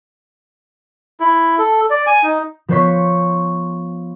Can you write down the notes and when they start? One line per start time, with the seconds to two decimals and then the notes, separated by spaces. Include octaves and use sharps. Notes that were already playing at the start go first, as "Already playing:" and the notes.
1.20 E4
1.58 A4
1.90 D5
2.07 G#5
2.23 D#4
2.68 F3 B3 C5 C#5 C#6 B6